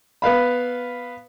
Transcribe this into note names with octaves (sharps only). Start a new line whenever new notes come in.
B3 B4 F5 B5